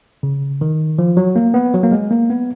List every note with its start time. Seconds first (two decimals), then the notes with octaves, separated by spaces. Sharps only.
0.23 C#3
0.61 D#3
0.99 F3
1.17 F#3
1.36 A#3
1.54 B3
1.74 F#3
1.83 A#3
1.92 G#3
2.11 A#3
2.30 B3